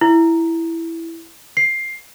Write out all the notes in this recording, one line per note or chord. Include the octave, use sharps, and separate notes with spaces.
E4
C7